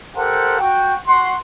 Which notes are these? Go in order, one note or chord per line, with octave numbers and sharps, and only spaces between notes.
G4 A4 A#4 C5 F#5
F#4 G5
F#4 F#5 C6